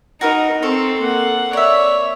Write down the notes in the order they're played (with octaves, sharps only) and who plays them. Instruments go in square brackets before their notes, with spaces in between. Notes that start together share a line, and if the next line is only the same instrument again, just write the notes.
[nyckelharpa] D#4 [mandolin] F#4 A#4 B4
[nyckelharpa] C4 [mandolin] A4 C#6
[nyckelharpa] A#3 F#5
[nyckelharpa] C#5 [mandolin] D5 E5